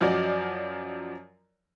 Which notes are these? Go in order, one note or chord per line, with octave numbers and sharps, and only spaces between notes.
F#2 F3 F#3 D5 D#5